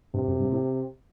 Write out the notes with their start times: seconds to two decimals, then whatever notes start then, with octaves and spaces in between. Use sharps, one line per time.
0.14 G2 C3
0.28 F#2
0.40 G2
0.52 A2